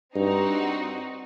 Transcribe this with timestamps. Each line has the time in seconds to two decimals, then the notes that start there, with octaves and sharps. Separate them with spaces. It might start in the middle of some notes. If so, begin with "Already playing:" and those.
0.15 G2 C4 D#4 F#4